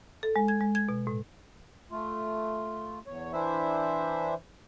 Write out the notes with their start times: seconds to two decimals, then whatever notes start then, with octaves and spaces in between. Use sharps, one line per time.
0.23 A4
0.36 G#3
0.48 G#6
0.60 G#3
0.75 G#6
0.89 B2
1.07 A2
1.91 A3 F4
3.07 E2 C#5
3.33 E3 D4 E4 C5 E5